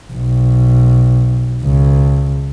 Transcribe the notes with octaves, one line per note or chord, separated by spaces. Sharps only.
B1
C#2